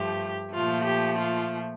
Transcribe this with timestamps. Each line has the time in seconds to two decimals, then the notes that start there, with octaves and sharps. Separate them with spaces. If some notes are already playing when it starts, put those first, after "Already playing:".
Already playing: G2 F3 A3 G4
0.54 A#2 F3 A3 F4
0.85 G4
1.18 F4